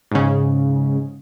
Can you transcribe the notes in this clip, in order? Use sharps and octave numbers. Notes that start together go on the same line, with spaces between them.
G#2 C#3